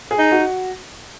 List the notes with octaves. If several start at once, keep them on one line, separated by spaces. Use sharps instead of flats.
G#4
D#4
F#4